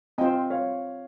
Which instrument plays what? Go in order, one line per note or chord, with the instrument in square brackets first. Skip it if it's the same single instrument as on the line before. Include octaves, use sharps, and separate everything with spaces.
[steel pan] C4 F4 C5 [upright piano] D#5 G5
[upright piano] C#5 F5